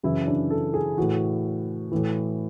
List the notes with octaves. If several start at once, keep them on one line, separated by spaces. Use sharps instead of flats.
F#2 C#3 E3 E4
D4
A4
G#4
A2 E3 F#4
A2 E3